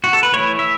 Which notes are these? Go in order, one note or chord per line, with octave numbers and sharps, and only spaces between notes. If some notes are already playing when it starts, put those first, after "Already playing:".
F#4
A4
B4
E3 A3 E4 C#5
E5